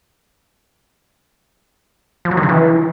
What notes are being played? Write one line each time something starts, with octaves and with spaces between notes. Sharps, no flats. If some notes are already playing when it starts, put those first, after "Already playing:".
F3
F#3
D#3
C#3
E3